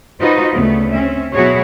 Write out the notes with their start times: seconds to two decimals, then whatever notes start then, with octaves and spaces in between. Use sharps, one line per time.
0.21 D#4 F4 F#4 B4 C5 D#5
0.54 D2 C#3 A3 B3
0.91 C4 C#4 E5
1.33 B2 F#3 E4 F#4 G#4 C#5